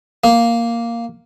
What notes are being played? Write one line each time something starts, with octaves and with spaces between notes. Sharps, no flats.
A#3